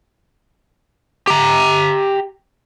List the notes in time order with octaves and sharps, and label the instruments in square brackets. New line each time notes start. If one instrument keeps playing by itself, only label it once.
[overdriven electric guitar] G4 A#5